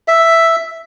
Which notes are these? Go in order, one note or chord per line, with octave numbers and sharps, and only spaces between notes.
E5